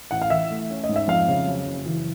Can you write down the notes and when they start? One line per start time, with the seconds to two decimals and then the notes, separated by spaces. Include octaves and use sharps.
0.11 A1 F#5
0.22 F5
0.30 E3 E5
0.50 A3
0.70 C#4
0.84 D#5
0.89 G#2
0.96 E5
1.08 F2 F5
1.28 C#3
1.47 F#3
1.66 F#1
1.86 E3